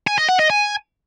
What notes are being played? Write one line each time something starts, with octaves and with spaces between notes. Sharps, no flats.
G#5
D#5
F#5
D#5
G#5